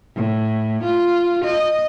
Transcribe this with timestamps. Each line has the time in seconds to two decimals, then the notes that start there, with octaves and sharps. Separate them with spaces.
0.16 A2
0.83 F4
1.45 D#5